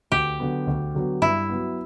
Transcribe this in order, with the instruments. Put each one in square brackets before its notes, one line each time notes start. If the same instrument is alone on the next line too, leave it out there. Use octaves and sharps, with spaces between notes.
[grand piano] D2 [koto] G4
[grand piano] D3 F#3 B3
D2
D3 F#3 B3
[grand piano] G2 [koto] E4
[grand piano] F#3 B3